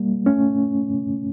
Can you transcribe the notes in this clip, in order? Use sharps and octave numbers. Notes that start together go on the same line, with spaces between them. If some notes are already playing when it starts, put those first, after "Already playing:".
Already playing: G3 A#3
A3 C#4